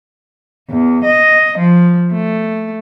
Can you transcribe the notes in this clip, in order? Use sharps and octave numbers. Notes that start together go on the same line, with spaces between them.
E2
D#5
F3
A3